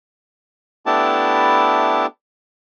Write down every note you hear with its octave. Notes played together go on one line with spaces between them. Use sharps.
A3 B3 D4 E4 G4 A5